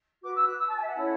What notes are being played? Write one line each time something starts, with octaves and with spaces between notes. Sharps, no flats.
F#4 B4 D6
E6
F#6
E6
A5
G#5
E5
F#5
C#4 E4 A4 C#5